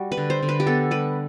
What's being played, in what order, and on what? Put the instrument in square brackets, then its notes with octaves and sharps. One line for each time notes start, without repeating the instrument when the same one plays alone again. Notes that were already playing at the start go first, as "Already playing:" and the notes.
Already playing: [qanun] G3 F#4
B4
D3
C5
D3
B4
G4
B3 A4
G3 B4